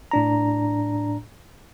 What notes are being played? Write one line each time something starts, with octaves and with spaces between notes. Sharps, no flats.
A2 D4 A#5